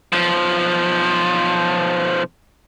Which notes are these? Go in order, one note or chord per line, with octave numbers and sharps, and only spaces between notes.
B1 F3